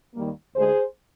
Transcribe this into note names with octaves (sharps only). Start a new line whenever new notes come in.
D#2 D#3 G3 A#3
D2 D3 G#3 G#4 C5